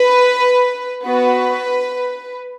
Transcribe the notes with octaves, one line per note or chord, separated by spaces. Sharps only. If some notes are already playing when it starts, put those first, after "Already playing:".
Already playing: B4
B3 F#4 B4